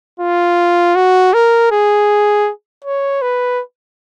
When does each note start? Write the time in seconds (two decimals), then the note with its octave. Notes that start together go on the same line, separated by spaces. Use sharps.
0.20 F4
0.95 F#4
1.34 A#4
1.71 G#4
2.84 C#5
3.22 B4